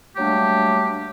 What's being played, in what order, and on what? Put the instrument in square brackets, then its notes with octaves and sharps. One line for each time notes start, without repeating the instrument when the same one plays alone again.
[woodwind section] F#3 G3 A3 A#3 D4 G4